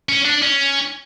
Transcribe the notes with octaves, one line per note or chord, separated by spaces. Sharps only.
C#4
D4
C#4